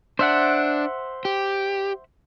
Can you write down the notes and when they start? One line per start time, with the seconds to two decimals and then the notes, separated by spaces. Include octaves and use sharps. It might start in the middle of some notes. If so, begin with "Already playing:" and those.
0.19 D4 C5 E5 F#5
1.25 G4